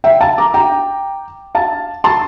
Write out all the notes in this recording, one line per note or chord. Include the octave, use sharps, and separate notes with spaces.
E5 G5
F5 A5
A#5 D6
G5 A#5
F5 A5
A5 C6